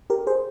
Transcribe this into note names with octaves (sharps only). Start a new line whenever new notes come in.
G4 A#4
G#4 C5